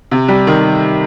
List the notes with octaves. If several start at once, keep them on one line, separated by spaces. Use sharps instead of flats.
C3
G3
D#3